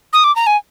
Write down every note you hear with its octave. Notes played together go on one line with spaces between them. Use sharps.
D#6
D6
A#5
G#5